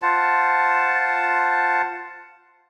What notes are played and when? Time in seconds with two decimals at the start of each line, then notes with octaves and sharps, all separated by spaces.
0.02 F4 C5 F#5 A5